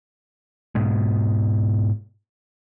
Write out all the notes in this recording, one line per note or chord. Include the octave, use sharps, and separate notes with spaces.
G#2 B2 G#3